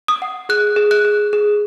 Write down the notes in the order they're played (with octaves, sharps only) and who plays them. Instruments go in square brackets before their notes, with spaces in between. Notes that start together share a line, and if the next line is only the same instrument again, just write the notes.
[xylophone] D#6
F#5
G#4 F#6
G#4
F#6
G#4
G#4